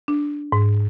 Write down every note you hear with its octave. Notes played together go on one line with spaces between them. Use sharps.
D4
G#2